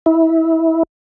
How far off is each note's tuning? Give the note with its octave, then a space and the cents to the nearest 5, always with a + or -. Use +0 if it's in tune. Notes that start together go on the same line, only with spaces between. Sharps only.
E4 -20